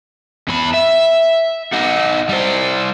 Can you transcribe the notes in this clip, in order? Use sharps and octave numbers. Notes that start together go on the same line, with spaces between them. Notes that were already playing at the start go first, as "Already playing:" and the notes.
E2 B5
E5
D#4 F#4
G3 C5